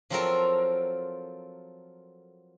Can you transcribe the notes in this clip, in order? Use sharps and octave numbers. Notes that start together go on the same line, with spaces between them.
F3 F#3 C4 F4 A4 A#4